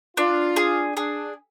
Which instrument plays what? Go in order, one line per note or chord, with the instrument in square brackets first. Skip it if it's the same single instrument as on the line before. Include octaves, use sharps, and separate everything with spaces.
[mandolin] D4 [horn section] F4
[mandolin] G#4
[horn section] D4 [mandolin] G#4